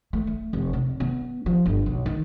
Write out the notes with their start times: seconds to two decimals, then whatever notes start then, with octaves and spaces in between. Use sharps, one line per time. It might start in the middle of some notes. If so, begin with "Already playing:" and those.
0.13 A3
0.27 A3
0.53 F1
0.73 C3
1.00 B3
1.46 F3
1.66 G1
1.86 B1
2.06 D#3